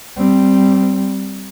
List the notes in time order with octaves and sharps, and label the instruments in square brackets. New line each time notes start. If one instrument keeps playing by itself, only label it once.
[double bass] G3 C4